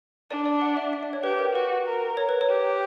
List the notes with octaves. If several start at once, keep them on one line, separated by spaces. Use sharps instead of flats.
D4 D5
D5
F#5
E5
E5
D5
C#5
G4 B4
A#4
F#4 B4
A#4
C#5
B4
C#5
G4